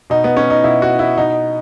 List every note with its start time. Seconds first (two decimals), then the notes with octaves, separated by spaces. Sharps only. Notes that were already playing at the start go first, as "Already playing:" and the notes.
0.10 B2 D#4
0.24 B3
0.37 C#4
0.50 D#4
0.64 B2 E4
0.82 F#4
0.99 E4
1.17 B2 D#4